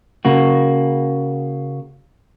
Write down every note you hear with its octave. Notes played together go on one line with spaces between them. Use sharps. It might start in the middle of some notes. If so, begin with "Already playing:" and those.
C#3 A#3 F#4